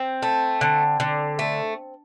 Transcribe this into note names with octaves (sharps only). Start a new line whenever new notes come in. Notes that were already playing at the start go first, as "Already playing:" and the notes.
Already playing: C4
A3
D3
D3
A3